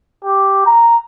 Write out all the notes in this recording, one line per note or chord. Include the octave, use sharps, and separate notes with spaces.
G4
A#5